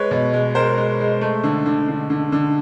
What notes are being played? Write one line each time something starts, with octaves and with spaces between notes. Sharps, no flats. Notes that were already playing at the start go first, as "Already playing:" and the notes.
Already playing: G#3 B4 C#5
B2
G#3
G#3 A#4 C5
G#3
G#3
A3
D3
D3
D3
D3
D3